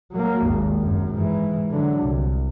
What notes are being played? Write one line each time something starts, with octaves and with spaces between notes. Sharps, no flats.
F#3 A#3
G#1 D#2
F#2
G#2 E3
D3 F#3
C2